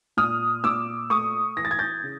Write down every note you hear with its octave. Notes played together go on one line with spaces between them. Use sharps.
A#2 D#6 F6
A#2 D6 E6
A3 C#6 D#6
E3 A#6
A6
G#6
G6 A6
C#3